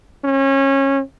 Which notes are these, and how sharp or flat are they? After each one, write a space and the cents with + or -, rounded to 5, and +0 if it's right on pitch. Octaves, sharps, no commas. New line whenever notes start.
C#4 -25